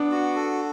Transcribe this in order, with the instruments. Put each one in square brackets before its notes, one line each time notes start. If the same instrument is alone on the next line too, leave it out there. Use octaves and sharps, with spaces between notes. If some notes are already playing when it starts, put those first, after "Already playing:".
Already playing: [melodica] B3 [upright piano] D4
[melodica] F#4
A4